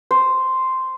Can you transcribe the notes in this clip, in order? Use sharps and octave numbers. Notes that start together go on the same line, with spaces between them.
C5